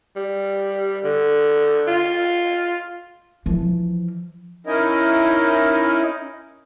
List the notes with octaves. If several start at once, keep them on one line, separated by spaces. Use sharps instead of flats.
G3
D3
F4
E3 F3
C#4 D#4 E4 A#4 D#5